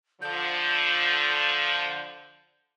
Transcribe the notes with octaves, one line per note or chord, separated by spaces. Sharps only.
D3 F3 G6